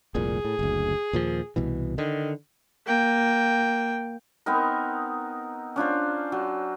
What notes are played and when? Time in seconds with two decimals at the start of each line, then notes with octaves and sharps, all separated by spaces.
0.15 F1 C2 A#2 G#4
0.45 A2
0.59 F#1 D2
1.13 D#2 A#2 F3
1.56 C2 B2 E3
1.98 D3 D#3
2.86 A#3 G5
4.46 B3 C4 D#4 A#4
5.76 C#4 D4 F4 C5
6.32 F#3